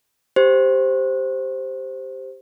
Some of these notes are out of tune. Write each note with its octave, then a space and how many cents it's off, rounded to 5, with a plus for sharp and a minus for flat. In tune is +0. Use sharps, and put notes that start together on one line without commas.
G4 +0 C5 +0